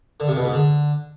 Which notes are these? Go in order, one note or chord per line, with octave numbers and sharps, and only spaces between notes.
D3
C3
B2
G#2
D3